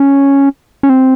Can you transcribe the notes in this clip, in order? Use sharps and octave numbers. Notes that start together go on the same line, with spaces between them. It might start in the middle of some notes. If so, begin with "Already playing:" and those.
Already playing: C#4
C#4
C4